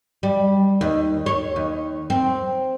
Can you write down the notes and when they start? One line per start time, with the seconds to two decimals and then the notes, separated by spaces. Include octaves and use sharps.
0.23 G3
0.81 D#2
1.26 C#5
1.56 D#2
2.10 C4